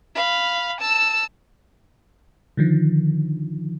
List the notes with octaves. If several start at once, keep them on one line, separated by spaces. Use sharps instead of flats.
F5 B5
A5 E6
D3 D#3 F3